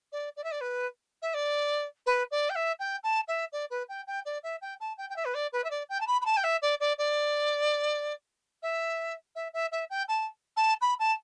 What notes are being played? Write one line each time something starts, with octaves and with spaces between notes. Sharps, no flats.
D5
D5
E5
D5
B4
E5
D5
B4
D5
G5
E5
G5
A5
E5
D5
B4
G5
G5
D5
E5
G5
A5
G5
G5
E5
B4
D5
B4
E5
D5
G5
A5
B5
B5
A5
G5
E5
D5
D5
D5
E5
E5
E5
E5
G5
A5
A5
B5
A5